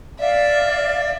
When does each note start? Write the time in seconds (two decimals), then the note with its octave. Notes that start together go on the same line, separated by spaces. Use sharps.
0.19 D5 E5 F5